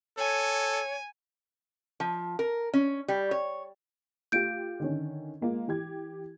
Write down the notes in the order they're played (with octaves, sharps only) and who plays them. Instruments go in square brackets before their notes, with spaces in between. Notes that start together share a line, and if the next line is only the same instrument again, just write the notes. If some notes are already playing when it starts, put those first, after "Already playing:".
[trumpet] A4 [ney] C#5 [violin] G#5
[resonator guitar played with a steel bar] F3
A#4
C#4
G3
C#5
[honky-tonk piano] A3 F4 G4 [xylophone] G6 D7
[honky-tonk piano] D3 D#3 C#4
G#3 A#3 F4
E3 G4 G#6